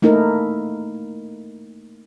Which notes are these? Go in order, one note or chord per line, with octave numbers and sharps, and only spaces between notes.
A3 A#3 D#4 E4 A#4